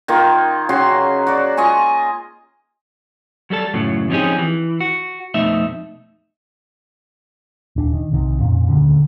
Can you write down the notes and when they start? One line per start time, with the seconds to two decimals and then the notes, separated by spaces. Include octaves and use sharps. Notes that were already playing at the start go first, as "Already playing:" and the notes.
0.08 D#3 A#3 D#4 F4
0.69 C#3 F#3 F#4 C6
1.27 F#4 D5
1.57 F4 D#5 G#5 C#6
3.50 F#3 G3 A4 A5
3.74 F#2 A2 C#3 F#3
4.10 F3 C4 C#4 D#4 G4 G#4
4.38 E3
4.81 F#4
5.34 F2 B2 A3 D#4 E5
7.76 D#1 D4
7.93 D#3
8.12 B1 C3 D#3
8.40 F2 A#2 C#4
8.69 D#1 D2 D3 C#4